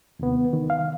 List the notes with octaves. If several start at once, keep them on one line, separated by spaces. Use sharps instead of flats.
D#2 C3 B3
D#3
F5